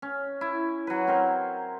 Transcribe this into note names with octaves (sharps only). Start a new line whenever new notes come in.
C#4
E4
F#3 B4
C4 A#4 C5